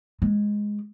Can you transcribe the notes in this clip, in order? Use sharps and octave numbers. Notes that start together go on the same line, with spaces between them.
G#3